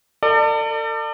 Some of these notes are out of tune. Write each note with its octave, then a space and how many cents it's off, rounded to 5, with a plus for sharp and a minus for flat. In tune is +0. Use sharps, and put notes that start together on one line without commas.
A4 +40 D5 +30